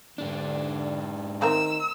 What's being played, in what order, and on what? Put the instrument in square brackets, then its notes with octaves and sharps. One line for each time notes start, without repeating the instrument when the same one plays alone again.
[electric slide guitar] G#2 D4 [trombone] D3
[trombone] D#3 [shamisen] A3 C4 A#4 [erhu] E6